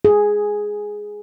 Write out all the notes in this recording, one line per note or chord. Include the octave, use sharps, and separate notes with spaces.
G#4